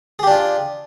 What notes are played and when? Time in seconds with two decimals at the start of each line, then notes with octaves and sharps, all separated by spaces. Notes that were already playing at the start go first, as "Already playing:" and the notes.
0.19 G#4
0.23 G4
0.27 D4
0.31 F4